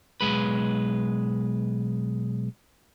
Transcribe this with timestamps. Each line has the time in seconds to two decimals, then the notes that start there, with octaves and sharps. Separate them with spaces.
0.21 B1 G2 G#3 B4